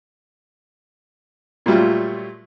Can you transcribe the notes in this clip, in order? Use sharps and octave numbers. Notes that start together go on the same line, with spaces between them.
A#2 F#3 G3 A3 F4